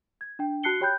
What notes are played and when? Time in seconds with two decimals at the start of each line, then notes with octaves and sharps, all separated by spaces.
0.21 G#6
0.39 D4 G5
0.63 F#4 A5 F#6 C7 C#7 G7
0.81 G4 C#5 G5 B5 F#6 G6